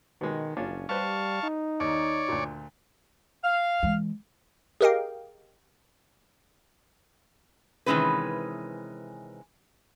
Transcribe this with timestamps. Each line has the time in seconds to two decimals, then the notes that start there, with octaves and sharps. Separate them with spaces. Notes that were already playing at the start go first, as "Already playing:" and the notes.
0.21 B2 D#3 G#3
0.57 F#1 C#4 D4 F4
0.89 G3 G4 B4 C5 F5 A5 C#6
1.43 D#4
1.80 D#2 C#5 D5
2.28 D2 A#2
3.44 F5
3.83 E3 G#3
4.81 G4 G#4 A#4 D#5 F5 G5
7.86 C3 D#3 E3 G#3 C#4 B4